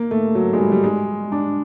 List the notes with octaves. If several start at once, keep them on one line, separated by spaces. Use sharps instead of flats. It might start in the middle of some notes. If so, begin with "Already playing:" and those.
Already playing: A#3
A3
F#3
G#3
G3
G3
G#3
D4